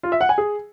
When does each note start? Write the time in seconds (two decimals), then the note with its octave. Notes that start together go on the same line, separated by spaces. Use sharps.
0.03 F4
0.12 E5
0.21 F#5
0.29 G#5
0.38 G#4